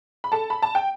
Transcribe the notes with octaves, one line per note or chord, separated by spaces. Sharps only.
B5
A4 A5
B5
A5
G5